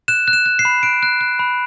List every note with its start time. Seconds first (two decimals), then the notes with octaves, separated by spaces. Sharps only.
0.08 F#6 E7
0.28 F#6
0.33 E7
0.46 F#6
0.59 C7
0.65 B5
0.83 F#6 D7
1.03 F#6
1.21 F#6
1.39 B5